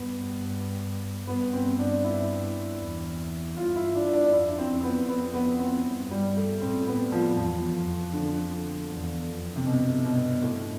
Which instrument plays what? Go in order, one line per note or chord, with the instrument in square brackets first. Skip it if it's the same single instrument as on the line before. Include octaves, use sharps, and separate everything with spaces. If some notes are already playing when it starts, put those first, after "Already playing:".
Already playing: [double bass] G2 [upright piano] B3
[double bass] G2 [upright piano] B3
[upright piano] C4
D4
E4
[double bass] E2
[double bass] G2 [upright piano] F4
[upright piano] E4
[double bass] G2 [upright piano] D4
[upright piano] D4
[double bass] F2 [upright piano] E4
[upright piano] C4
[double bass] F2
[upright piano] B3
[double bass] F2 [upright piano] B3
[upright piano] B3
C4
[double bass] G2
[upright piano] G3
A3
[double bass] A2 [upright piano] C4
[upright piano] B3
F3
[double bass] E2 [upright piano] F3
[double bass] F2
[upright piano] D3
[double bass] E2
F2
[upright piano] C3
[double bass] G2 [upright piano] B2
[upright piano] B2
A2